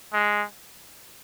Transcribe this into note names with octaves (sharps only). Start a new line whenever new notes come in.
G#3